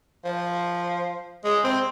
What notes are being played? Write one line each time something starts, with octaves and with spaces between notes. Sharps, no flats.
F3
G#3
C4